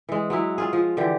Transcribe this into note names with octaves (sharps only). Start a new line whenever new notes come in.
E3 G#3
F#3 G#3 E4
C#4 F4 G#4
F3
D3 E3 G4